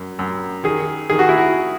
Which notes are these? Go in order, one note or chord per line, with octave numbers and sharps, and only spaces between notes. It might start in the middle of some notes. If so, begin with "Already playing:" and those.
Already playing: F#2
F#2
D#3 G#4
D#3 G#4
F#4
E4
F#4